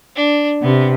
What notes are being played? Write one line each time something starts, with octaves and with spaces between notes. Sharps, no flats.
D4
C3 B3